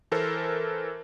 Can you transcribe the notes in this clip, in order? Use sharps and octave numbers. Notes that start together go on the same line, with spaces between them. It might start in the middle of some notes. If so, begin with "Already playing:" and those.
E3 A4 A#4 C5